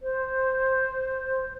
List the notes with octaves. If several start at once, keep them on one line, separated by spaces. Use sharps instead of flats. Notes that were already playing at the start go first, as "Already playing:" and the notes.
C5